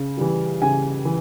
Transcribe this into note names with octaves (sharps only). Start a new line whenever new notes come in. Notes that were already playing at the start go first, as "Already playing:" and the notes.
Already playing: C#3
E3 G3
C#3 G#5
E3